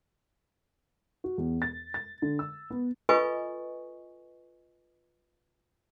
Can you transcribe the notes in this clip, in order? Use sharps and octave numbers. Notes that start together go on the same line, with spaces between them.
F#4
E2
A6
A6
D3
E6
B3
F4 A4 B4 D#5 G#5 C#6